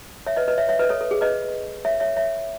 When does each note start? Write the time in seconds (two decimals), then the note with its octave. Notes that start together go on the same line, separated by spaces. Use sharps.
0.27 C#5 E5
0.37 B4 D#5
0.48 B4 D#5
0.58 C#5 E5
0.69 C#5 E5
0.79 B4 D#5
0.89 A4 C#5
1.01 A4
1.11 G#4
1.21 B4 D#5
1.85 C#5 E5
2.00 C#5 E5
2.17 C#5 E5